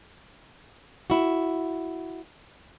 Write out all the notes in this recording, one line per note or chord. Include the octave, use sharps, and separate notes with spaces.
E4 F#4